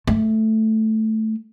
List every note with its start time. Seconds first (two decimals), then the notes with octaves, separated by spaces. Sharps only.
0.07 A3